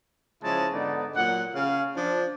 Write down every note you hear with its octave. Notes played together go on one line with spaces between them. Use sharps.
C#3 F3 G#3 E4 A5
G#2 D3 B3 D#4 D5
A#2 F#3 F#5
C#3 F5
F3 D4